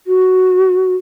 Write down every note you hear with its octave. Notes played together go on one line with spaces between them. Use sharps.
F#4